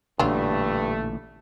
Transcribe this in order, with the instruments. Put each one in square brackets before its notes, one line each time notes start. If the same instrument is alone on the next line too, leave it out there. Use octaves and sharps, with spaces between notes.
[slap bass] A1 A#2 D3 [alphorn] G2 [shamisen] F#3 D4 F4 [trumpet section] A3